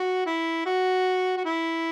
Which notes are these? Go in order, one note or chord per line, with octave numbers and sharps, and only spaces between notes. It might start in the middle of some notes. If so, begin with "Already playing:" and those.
Already playing: F#4
E4
F#4
F#4
E4